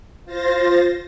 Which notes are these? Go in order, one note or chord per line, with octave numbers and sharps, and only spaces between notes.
F4 C5 A6 A#6